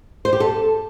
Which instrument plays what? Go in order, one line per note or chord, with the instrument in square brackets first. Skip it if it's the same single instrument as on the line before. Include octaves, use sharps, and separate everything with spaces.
[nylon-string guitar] C5
G4
A4